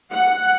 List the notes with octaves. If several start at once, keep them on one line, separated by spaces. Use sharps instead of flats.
F#5